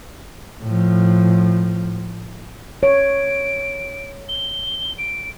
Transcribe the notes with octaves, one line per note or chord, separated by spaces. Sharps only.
A2 F3
C#5 D7
G7
D7